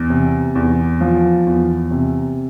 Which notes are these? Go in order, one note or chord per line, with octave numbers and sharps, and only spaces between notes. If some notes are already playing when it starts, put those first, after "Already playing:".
Already playing: E2
C3
E2
F3
E2
C3